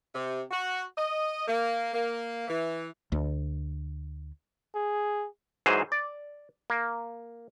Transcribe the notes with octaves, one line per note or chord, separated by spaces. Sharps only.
C3
F#4
D#5
A#3
A#3
E3
D2
G#4
G#2 E3 F#3 G#4 C5
D5
A#3